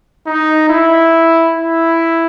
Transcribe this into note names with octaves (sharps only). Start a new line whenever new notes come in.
D#4
E4
E4